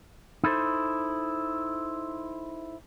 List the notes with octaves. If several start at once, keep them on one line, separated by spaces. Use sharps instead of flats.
D#4 E4 A4 C5